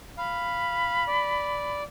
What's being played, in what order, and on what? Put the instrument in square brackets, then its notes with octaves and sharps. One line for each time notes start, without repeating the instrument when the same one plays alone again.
[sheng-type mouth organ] F5 [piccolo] B5
[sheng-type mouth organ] D5